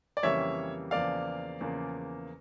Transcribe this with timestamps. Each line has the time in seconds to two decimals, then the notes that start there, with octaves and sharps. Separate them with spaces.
0.17 D5
0.23 F2 C#3 E3 G3 A#3 C#5 E5
0.91 E2 C#3 F3 A#3 D5 F5
1.61 E2 C#3 F3 A#3